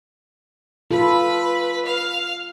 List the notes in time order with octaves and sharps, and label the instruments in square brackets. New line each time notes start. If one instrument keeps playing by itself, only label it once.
[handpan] F4 A4 [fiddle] B4 B5
[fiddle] F5